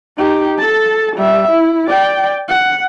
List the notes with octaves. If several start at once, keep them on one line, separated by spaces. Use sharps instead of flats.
D#4 G4
A4 A5
G3 E5
E4
D5 G5
F#5